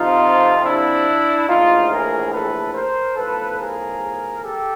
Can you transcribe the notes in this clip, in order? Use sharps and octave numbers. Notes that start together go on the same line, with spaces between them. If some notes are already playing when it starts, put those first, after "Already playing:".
Already playing: F2 C3 F3 D#4 F4
D4 E4
A#1 A2 E3 D#4 F4
G#4 A#4
A4 B4
A#4 C5
B1 A2 F3 A4 B4
G#4 A#4
G4 A4